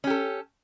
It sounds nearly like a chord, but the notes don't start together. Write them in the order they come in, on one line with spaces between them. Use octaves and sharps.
C#4 G4 A4